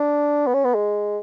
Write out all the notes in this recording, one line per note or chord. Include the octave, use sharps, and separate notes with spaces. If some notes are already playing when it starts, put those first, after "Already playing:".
Already playing: D4
B3
C#4
B3
G#3